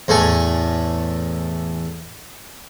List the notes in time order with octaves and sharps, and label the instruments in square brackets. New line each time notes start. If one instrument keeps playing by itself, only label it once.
[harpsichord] E2 A2 A3 G#5 C#6